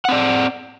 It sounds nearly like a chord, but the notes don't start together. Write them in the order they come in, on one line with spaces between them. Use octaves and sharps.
F#5 C4 D5